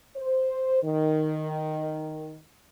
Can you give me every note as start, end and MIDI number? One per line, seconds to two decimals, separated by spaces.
0.17 0.83 72
0.83 2.38 51